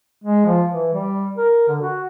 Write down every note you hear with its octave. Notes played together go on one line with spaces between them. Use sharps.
G#3
F3
E3
G3
A#4
D3
F#4